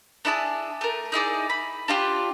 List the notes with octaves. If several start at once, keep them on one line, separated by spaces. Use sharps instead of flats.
D4 E4 G#4 A5
A3 A#4
D#4 E4 G#4 D5
B5
D4 F4 G4